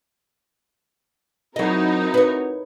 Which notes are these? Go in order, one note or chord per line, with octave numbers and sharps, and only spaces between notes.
F#3 C4 D#4 E4 F#4 A#4 D#5
B4 C#5